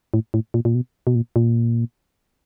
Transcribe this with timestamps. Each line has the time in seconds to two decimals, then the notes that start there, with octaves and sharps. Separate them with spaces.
0.14 A2
0.34 A2
0.54 A#2
0.65 A#2
0.75 B2
1.07 B2
1.15 A#2
1.36 A#2